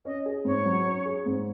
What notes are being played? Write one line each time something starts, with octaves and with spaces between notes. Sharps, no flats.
C#4 D#5
G#4
G#2 C#5
F#3
C#4
G#4
G#2